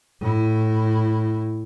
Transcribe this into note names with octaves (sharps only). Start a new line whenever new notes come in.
A2 E4